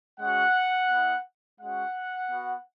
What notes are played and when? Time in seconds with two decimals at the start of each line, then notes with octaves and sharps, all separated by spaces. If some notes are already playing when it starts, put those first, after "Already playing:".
0.20 G#3 C#4 F#4 F#5
0.90 B3 E4
1.60 G#3 C#4 F#4 F#5
2.31 B3 F#4